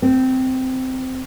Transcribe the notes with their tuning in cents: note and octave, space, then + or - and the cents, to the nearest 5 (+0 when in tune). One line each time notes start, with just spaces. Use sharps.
C4 -15